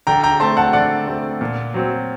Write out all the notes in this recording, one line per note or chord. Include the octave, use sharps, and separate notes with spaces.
D3 G5 A#5
G5 A#5
A3 C4 A5 C6
F#5 A5
D3 D5 F#5
A3 C4
A#2
F#3 C4